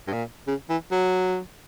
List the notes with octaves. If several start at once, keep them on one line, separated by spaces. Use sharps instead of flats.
G2
A#2
C#3
E3
F#3